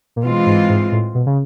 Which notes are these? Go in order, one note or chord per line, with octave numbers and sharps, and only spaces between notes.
A#2
B2 E3 G#3 C4 F4
G#2
G#2
A2
B2
C#3